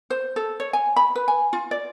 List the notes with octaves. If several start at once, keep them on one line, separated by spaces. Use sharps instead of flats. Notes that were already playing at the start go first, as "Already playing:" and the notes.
C5
A4
C#5
G#5
B5
B4
G#5
F4
D5